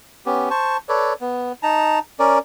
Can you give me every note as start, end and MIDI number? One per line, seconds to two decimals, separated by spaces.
0.26 0.49 59
0.26 0.49 61
0.26 0.49 67
0.51 0.77 72
0.51 0.77 81
0.51 0.77 85
0.89 1.13 69
0.89 1.13 71
0.89 1.13 73
0.89 1.13 74
1.21 1.52 59
1.63 1.99 63
1.63 1.99 81
1.63 1.99 82
2.19 2.39 61
2.19 2.39 70
2.19 2.39 74